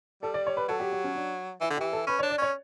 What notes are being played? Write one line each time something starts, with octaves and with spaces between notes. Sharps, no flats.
G3 A4
D5
C#5
B4
F#3 A4
G4
G4
C#4
D4
E3 E4
D3
G4
E3
A4
C#4 B4
C#5
D4
D5
C#4 C#5